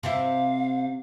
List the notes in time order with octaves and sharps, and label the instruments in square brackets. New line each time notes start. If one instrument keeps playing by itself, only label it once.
[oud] C3 C4 E4 [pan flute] F5